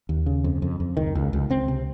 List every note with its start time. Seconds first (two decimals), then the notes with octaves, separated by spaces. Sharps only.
0.09 D#2
0.26 C#3
0.44 F2
0.62 F2
0.80 F2
0.97 C#2 D#3
1.15 C#2
1.33 C#2
1.50 C#2 C4
1.68 C3